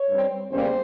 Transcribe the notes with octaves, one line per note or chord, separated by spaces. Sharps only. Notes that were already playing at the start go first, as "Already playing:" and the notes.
Already playing: C#5
G2 G3 C4
E2 C#3 G3 A#3 C#4 C5